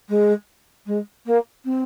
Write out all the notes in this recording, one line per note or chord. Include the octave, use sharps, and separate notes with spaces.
G#3
G#3
A#3
C4